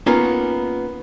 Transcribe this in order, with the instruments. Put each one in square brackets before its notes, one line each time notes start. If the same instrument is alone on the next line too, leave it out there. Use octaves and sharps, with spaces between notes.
[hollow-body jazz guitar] A#3 B3 C#4 D#4 F4 A#4